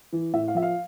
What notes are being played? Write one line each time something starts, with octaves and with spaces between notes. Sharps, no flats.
E3
A2 E5
F5
F3 E5
F5